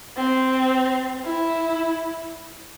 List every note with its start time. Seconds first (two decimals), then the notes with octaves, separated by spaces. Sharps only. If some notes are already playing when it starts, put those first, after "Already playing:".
0.17 C4
1.25 E4